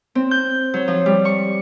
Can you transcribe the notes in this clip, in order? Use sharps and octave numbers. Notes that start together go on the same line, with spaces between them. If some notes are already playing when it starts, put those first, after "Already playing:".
C4
G6
F#3
F3
G3
C#6